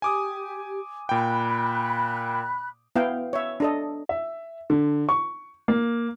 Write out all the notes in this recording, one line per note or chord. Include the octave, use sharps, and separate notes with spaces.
G4 G#5 D6 D#6
A#2 G5 B5 F#6
B3 E4 F5 G5
C#5 E5
D4 A4 D#5
E5
D3
C#6
A#3